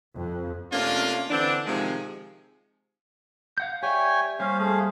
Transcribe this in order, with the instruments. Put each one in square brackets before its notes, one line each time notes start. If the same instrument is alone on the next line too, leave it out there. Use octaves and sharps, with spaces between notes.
[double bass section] F2
[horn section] C3 A3 A#3 C#4 D4 F4
D3 E3 C4 D4
C3 D#3 F3 G#3
[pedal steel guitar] F5 F#5 G6
[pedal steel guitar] G4 D5 E5 [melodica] C#5 G5 G#5
[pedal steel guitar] G3 A#3 C5 [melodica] C#4 F5
[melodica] A3 G#4 F5